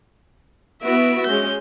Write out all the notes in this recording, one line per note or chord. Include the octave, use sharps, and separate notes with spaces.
B3 E4 F#4 E5 D7
G#3 C#4 G6